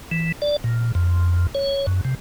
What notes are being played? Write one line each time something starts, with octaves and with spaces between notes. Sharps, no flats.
E3
D5
A#2
F2
C#5
F#2
C3